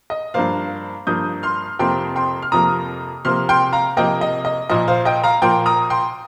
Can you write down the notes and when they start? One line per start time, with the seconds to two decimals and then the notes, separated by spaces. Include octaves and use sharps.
0.10 D#5
0.34 G2 F3 A#3 C5 F5
1.07 G2 F3 A#3 D#6 G6
1.43 C6 F6
1.79 F2 C3 F3 A#3 G5 C6
2.16 G5 C6
2.42 F6
2.52 F2 C3 F3 A#3 A#5 D#6
3.25 C3 F3 A#3 C6 F6
3.49 G5 C6
3.72 F5 A#5
3.97 C3 F3 A#3 D#5 G5
4.21 D#5
4.45 D#5
4.70 A#2 F3 A#3 D#5
4.88 C5 F5
5.05 D#5 G5
5.24 F5 A#5
5.42 A#2 F3 A#3 G5 C6
5.66 A#5 D#6
5.90 G5 C6